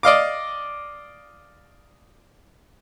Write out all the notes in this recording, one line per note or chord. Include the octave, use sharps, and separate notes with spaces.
D5 D#5 F5 D6